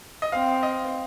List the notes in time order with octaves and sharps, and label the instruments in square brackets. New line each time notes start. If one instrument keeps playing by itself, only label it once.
[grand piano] D#5
[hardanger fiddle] C4 [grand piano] F5
[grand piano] D#5